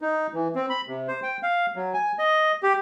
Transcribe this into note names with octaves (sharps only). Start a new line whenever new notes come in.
D#4
E3
C4
B5
C3
C5
G5
F5
F#3
G#5
D#5
G4